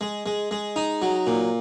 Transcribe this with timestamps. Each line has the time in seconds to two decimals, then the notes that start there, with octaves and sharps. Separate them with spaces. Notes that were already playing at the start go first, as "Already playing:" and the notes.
0.01 G#3
0.26 G#3
0.51 G#3
0.76 D#4
1.02 F#3
1.27 A#2